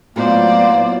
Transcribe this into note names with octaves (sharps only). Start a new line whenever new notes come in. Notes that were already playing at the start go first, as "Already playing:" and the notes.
A2 F#3 A#3 B3 F4 C5 D5